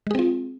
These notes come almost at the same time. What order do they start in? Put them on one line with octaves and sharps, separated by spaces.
G#3 G#4 C4 F4